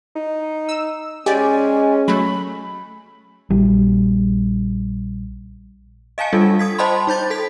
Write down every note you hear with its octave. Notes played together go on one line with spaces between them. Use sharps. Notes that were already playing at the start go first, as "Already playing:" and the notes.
D#4
E6
G#3 C#4 G4 D5 G#5
F#3 A3 B5
A#1 G3
D#5 F5 G#5 A5 C#7
G3 D4 F4 A4
D#6 G#6 B6
C5 D#5 G5 A5 B5 C6
D#4 C5 G6 A6
A4 B6